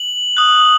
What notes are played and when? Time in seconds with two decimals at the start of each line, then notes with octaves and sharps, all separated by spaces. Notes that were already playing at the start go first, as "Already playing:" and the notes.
Already playing: F#7
0.37 D#6 F#6